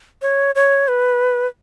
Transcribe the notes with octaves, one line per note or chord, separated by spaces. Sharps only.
C#5
C#5
B4